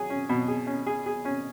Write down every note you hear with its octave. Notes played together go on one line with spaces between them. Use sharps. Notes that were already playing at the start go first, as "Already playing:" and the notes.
Already playing: F#3 G#4
C#4
B2
G#4
C#4
G#4
G#4
C#4